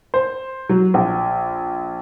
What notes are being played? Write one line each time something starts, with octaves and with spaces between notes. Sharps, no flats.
C5
F#3
A#1